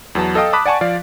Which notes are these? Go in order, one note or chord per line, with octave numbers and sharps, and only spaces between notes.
E2 F#3 B3 A5
A4 D#5 F5 G5 D#6
A5 B5 D6 D#6 F#6 B6
D5 F#5 G#5 A5 C#6
F3 D5 F5